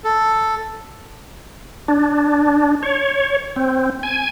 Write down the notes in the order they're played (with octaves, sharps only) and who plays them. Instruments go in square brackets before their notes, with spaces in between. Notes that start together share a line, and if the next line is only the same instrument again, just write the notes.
[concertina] A4
[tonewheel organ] D4
C#5
C4
G#5